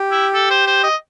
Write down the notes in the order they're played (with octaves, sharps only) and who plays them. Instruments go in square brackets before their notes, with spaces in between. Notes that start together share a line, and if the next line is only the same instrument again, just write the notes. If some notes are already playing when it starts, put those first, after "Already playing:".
Already playing: [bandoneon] G4
[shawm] E4
A4
C5
C5
D#5